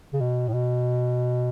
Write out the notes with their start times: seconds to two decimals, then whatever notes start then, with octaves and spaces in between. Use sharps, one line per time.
0.13 C#3
0.21 B2
0.48 A2
0.53 B2